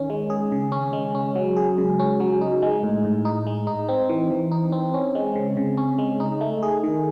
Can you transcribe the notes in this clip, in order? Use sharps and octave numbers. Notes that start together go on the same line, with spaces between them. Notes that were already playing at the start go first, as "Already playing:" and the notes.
Already playing: D#3 C#4
G#3
G#4
C#3
C#4
G#3
C#4
F#3
G#4
C#3
C#4
F#3
D#4
G#3
A2
A2
D#4
G#3
D#4
C4
E3
E3
D#4
C4
C#4
G#3
C#3
C#3
C#4
G#3
D#4
A3
G#4
D#3